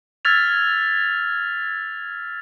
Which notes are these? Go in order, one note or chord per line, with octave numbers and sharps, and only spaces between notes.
E6 F6 G#6 A6 B6 F7